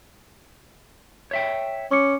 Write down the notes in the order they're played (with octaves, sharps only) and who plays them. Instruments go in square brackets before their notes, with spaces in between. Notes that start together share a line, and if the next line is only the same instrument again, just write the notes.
[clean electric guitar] C#5 E5 G5
[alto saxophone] C#4 [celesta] C#6 D6 C#7